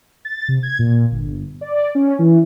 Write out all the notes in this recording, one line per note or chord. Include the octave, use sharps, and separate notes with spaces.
A6
C3
G#6
A#2
G1
D5
C#4
E3